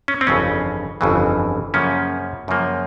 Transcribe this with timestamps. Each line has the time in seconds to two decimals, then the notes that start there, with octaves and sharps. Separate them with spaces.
0.08 C#4
0.21 C4
0.27 G1 F2 C#3 E3 C#4
1.01 G1 F2 C#3 E3
1.74 F#2 C#3 F3 A#3 C#4
2.48 F#2 C#3 F3 A#3